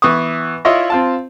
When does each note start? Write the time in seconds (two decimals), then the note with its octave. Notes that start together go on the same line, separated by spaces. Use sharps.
0.02 E3 B3 C#6 D#6
0.65 E4 F4 C#5 D#5
0.90 C4 F4 A5